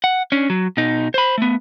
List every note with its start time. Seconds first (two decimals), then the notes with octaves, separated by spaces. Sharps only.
0.04 F#5
0.32 C#4 D4
0.50 F#3
0.77 B2 D#4
1.14 C5 B5
1.38 A3 B3